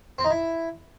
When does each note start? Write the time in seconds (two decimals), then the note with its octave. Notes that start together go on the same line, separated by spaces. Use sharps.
0.18 C4
0.24 D#4
0.30 E4